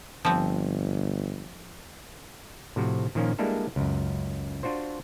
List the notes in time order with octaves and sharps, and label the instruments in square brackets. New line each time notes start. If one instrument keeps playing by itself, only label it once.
[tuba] G1 [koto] F3 C4
[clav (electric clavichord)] A2 C3 F3 F#4
A#2 D#3 F3 A#3 C#4 A#4
G3 G#3 A#3 D4 E4 A4
C#2 F#2
D4 F4 F#4 C5